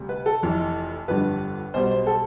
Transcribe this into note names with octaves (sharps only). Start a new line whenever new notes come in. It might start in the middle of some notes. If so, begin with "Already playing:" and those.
Already playing: D2 C3 G3
B4
A4
F1 F2 E3
G1 F2 D3 G3 B4
B1 B2 G3 C5
C5
A4